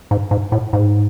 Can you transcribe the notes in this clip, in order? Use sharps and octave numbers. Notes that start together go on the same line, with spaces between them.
G#2
G#2
A2
G#2